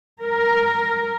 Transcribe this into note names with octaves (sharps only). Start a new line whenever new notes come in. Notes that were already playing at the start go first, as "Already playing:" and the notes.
A#4